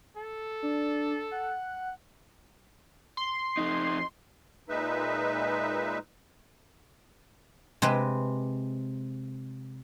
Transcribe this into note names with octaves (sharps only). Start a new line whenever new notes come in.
A4
D4
F#5
C6
F2 D#4
A#2 G#3 D#4 B4 E5
C3 G#3 C4 B4